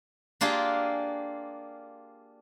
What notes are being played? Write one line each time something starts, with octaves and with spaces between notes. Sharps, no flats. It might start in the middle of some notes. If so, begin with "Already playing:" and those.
A#3 D4 F4 G4 G#4